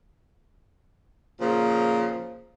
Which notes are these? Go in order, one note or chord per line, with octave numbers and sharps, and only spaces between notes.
A#2 C#3 F3